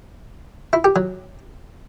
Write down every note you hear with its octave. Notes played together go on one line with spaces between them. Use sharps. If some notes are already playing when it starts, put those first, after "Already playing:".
E4
G4
F#3